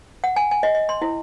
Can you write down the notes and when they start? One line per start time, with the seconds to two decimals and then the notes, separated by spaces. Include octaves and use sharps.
0.24 F#5
0.36 G#5
0.51 G#5
0.63 D#5
0.75 D#5
0.89 C6
1.02 E4